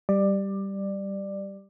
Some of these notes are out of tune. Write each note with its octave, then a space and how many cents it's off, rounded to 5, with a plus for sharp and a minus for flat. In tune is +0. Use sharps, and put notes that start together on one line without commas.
G3 +0 D5 +15